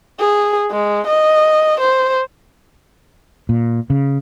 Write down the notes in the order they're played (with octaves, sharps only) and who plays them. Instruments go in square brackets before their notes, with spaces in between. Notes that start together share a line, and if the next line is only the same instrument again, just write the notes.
[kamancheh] G#4
G#3
D#5
C5
[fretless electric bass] A#2
C#3